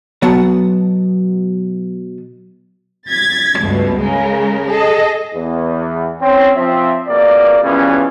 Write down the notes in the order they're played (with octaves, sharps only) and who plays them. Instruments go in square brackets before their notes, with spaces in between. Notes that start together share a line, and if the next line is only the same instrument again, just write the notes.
[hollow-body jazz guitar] B2 F#3 B3 F#5 A5
[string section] G#6 A6 B6
C#2 G2 B2 A3
C#3 G#3 A#4
G#4 A4 D#5
[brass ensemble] E2
C4 C#4
F3 C4 E5
C#2 B2 A#3 A#4 D5
C#3 E3 F3 G3 B3 C#4